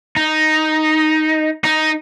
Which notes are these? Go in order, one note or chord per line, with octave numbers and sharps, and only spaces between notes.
D#4
D#4